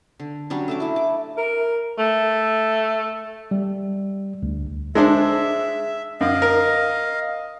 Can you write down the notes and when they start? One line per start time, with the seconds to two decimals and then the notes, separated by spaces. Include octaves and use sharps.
0.20 D3
0.50 F#3 G3 C#4 D4
0.68 A3 E5 D6
0.80 A3 E4
0.96 D6
1.37 A#4
1.98 A3
3.51 G3
4.43 D2
4.95 G#3 D4 C5 E5
6.21 F#2 D#5 F5
6.42 A#4